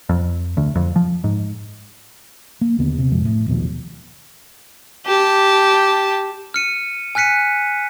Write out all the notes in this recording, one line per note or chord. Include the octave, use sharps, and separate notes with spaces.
F2
D2
F2
F3
G#2
A#3
D#2 D3 B3
C3
A#1 F2 F3 G#3
A2
A#1 D#2 B2 F3
G4 A5
F6 C#7 D#7
G#5 F6 F#6 B6 C#7 D#7